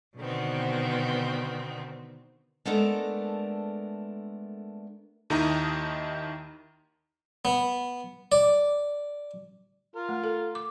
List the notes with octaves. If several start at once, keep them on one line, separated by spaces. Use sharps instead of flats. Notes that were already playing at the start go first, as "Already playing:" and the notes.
B2 D3 D#3 B3 C4
G#3 A3 B3 D4 A4 A#4
D#2 D#3 D#4 E4 A#5 D#6
B3
D5
F4 A#4
A3
A4
D6